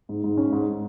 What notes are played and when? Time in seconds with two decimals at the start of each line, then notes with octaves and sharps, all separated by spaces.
0.09 G#2
0.24 G#2
0.37 C#4
0.52 G#2